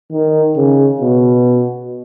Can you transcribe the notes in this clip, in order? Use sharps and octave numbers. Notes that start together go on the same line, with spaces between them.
D#3
C#3
B2